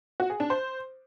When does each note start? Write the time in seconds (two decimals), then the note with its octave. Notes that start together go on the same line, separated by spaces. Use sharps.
0.20 F#4
0.30 G#4
0.40 D4
0.50 C5